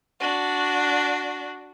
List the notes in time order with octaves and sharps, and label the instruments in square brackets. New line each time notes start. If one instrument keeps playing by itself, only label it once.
[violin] D4 F#4